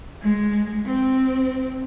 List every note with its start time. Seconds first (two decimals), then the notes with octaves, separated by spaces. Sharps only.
0.22 G#3
0.85 C4